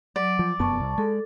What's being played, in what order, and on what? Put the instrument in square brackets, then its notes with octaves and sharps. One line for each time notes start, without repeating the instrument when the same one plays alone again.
[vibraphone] F#3 [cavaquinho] D5
[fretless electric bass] F3
[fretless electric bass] F1 F#2 B3 [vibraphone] A5 C#6
[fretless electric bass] C2
[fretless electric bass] G#3 [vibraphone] A4